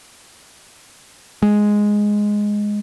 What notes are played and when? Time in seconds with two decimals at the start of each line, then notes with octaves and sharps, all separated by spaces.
1.42 G#3